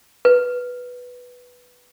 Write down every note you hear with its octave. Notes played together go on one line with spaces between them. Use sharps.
B4